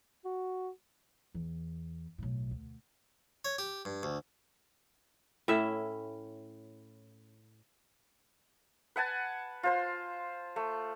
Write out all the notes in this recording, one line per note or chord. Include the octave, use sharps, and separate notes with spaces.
F#4
E2
B1 A2
D2
C#5
G4
G2
D2
A2 C#4 E4 E5
B4 F#5 G#5 A5
F4 C5 C6
A3